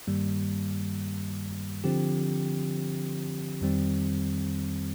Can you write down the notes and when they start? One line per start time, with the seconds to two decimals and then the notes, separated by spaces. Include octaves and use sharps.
0.07 G2 D#3 G3 A#3
1.84 D3 F3 C4 G4
3.61 F2 D#3 G3 C4